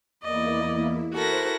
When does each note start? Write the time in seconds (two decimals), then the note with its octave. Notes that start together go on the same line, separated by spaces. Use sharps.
0.23 E2 A#3 E4 D5 D#5
1.14 E4 F#4 A4 A#4 C5 F#6 A#6